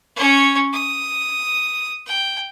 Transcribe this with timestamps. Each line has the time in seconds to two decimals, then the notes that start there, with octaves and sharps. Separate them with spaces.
0.16 C#4 C#5
0.73 D#6
2.07 G5